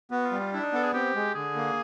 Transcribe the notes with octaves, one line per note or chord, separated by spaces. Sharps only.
B3 F#4
F4
G3
F4
D4 E4
D#4
B3 A4
G#4
C4 G4
G#3
D3 G#4
A#3